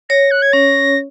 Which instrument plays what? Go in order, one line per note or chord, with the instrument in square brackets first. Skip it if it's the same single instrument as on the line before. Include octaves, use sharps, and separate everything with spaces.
[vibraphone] C#5 [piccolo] A#6
[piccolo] F#6
G#6
[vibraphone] C#4 [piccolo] A#6